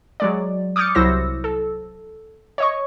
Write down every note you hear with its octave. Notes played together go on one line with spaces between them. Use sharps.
F#3 G#3 D5
D6 D#6 F6 G6 A6 C#7
C2 F#3 E4 C5 E6 A#6
A4
C#5 D#5 C#6